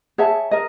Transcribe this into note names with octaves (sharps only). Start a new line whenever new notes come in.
G#4 C#5 E5 A5
A#4 D#5